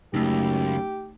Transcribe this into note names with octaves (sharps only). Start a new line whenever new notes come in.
C#2 F#2 A3 D#4 G4